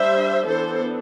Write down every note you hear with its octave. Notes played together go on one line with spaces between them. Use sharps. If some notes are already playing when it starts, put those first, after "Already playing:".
Already playing: G3 D4 C5 E5
E3 B3 D4 A4 C5